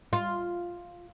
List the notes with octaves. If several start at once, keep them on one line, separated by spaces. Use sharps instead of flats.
F4